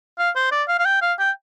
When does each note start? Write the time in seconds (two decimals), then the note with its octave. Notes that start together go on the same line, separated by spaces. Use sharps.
0.18 F5
0.35 C5
0.51 D5
0.68 F5
0.79 F5
0.85 G5
1.01 F5
1.19 G5